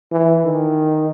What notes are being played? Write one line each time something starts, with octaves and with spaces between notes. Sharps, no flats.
E3
D#3